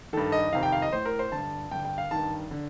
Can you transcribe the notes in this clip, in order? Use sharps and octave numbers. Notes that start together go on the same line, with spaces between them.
G2 D#3 A4
D#5
F2 C3 D#3 F5
G5
F5
D#5
A2 C5
A#4
C5
G2 D3 A5
G2 D3 G5
G5
F5
G2 D#3 A5
D3